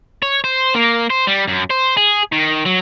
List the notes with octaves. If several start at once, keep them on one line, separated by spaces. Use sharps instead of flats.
C#5
C5
A#3
C5
G3
F#2
C5
G#4
D#3
F#3